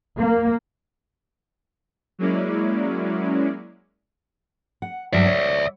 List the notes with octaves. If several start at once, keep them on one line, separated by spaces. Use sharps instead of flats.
A#3
F#3 G#3 A#3 C#4 E4 D5
F#5
G2 F#3 D5 E5
C#5